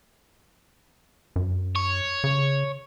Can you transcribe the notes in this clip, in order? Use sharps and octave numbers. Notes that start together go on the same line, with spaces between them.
F#2
C#5
C#3